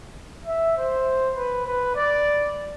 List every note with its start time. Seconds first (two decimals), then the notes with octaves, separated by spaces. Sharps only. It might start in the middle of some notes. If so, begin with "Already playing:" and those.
0.45 E5
0.76 C5
1.36 B4
1.66 B4
1.96 D5